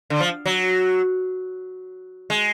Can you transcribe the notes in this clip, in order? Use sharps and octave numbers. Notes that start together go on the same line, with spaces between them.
D3
F3
F#3
G#3